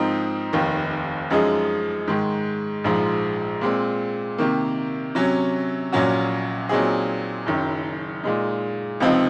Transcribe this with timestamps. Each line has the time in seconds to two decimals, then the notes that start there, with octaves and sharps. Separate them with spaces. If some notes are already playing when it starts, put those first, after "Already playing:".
Already playing: G#2 F3 C4 D#4 A#4
0.53 F1 D#2 D#3
1.30 F#2 F3 G#3 D#4 G#4
2.08 G#2 D#3 G#3
2.84 A#1 G#2 F3 G#3
3.61 A#2 G#3 C4
4.38 C3 D#3 A#3
5.15 C3 F#3 C#4
5.92 A#1 A#2 F#3 C#4 F#4
6.69 A#2 F#3 C4 D#4 G#4
7.46 F#1 F#2 D#3
8.23 A#2 G#3 D#4
9.00 C#2 C3 F3 C4 D#4